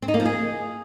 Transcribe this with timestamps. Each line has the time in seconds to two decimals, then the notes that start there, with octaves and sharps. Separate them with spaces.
0.02 C4
0.08 D#4
0.14 A#3
0.20 F3
0.25 G#4